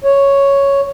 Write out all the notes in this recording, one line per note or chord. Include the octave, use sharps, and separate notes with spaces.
C#5